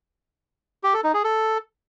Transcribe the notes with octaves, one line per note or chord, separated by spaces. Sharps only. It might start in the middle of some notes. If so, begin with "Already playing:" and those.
G4
A4
D#4
G#4
A4